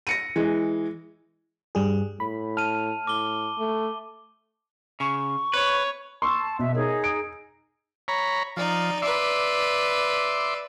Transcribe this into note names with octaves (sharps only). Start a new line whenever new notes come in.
A#6 C#7 D#7
E3 G#3
G2 G3 G#4
A2 B5
A5 F6 D#7
A2 D6 G7
A3
C#3 C#6
B4 C#5
A5 C6 C#6 E6
B2 E5
D#4 G#4 A#4 C#5 D#5
D7
C#5 A#5 B5
F3 D#4 D5
B4 D5 E5 C6 D6